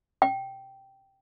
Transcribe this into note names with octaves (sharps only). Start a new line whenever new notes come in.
G5